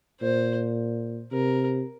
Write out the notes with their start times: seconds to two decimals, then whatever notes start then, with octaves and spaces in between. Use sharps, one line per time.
0.21 A#2 C5
1.32 C3 A#4